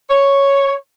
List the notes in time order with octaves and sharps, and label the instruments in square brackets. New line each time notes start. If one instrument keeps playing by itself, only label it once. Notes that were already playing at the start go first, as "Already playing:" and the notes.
[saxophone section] C#5